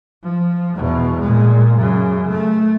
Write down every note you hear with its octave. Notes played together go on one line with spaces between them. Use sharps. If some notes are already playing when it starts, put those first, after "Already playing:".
F3
E2 B2
A#2 G#3
F#2 C#3
A3